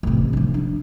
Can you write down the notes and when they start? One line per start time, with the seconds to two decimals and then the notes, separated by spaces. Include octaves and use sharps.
0.03 A1 C3
0.33 D3 F3
0.54 D4